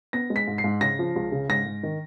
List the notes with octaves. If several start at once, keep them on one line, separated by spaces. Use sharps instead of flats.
B3 A#6
G#3
B6
G#2
C7
G#2
C#3 A#6
F3
C#2
C#3
G#2 A#6
G#2
D#3